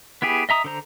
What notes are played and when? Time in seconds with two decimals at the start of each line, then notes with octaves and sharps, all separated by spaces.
0.22 B3 E4 G4 G#4
0.49 D#5 E5 A#5 D#6
0.64 D3 A4 C5 A#5